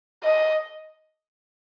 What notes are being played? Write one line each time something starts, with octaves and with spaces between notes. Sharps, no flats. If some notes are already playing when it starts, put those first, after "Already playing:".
D#5